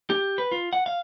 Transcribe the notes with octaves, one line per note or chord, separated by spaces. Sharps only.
G4
B4
F4
F#5
F5